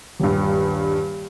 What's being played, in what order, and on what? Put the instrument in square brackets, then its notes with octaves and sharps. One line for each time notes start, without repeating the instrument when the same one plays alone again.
[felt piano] D#1 G2